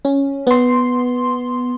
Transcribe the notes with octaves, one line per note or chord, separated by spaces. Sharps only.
C#4
B3 C6